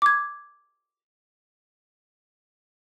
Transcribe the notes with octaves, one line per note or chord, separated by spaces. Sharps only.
D6 G#6